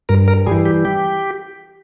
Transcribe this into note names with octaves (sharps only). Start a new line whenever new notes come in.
G2 A#4
A#4
E3 G3 G#4
G4
G4